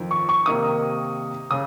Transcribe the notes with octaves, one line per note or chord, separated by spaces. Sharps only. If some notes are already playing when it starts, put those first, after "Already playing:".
Already playing: F2 D#3
C#6
C#6
C3 D#3 A#3 D#4 D#6
C#3 D#6